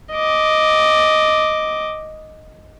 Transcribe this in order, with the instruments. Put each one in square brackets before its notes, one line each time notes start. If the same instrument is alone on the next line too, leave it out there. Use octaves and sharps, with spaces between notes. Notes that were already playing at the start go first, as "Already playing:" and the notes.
[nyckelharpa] D#5 D6